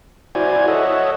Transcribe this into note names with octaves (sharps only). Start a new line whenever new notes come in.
E4 F#4 C5 D5 G#5
A4 C#5 D#5 E5 F#5